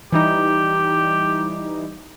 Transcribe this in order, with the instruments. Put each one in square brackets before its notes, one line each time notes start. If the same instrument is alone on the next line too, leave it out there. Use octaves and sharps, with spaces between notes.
[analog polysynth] E3 G3 D#4 [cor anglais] G4